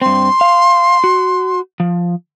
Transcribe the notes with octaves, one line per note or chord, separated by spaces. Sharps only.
G2 C4 C6
F5
F#4
F3